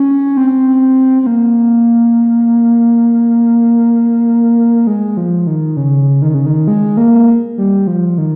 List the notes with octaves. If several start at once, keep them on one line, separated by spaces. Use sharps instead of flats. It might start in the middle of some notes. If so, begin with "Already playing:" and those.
Already playing: C#4
C4
C4
A#3
G#3
F3
D#3
C#3
D#3
C#3
D#3
G#3
A#3
G3
F3
D#3